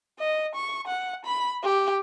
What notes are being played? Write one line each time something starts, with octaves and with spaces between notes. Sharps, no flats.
D#5
C#6
F#5
B5
G4